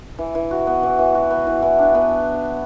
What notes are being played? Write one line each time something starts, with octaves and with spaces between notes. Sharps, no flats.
E3
E3
F#4
B3
E3
E3
F#4
B3
E3
E3
D4
B3